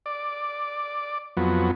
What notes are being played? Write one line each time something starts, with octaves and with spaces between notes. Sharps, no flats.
D5
F2 F#3 B3